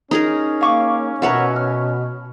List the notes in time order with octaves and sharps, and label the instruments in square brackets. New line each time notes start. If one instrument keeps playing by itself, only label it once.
[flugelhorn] C#4 [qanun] D#4 G#4 A#4
[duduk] A#3 [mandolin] F5 C#6 D6
[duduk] B2 [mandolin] A#4 F#5 [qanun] B4 C#5 E5
[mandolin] F6